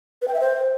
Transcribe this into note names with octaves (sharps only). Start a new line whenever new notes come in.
B4
G5
E5
C5